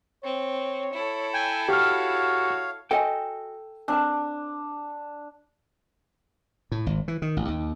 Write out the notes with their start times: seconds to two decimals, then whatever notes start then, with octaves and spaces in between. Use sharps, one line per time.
0.24 C4 C#5
0.93 E4 A4
1.34 G5 G#5
1.69 F#4 G4 C#5 F5 F6
2.91 F#4 A4 D#5 G5 G#5
3.88 C4 D4 A#4 A5
6.72 A2
6.86 G#1
7.08 E3
7.22 D#3
7.37 A1
7.48 D#2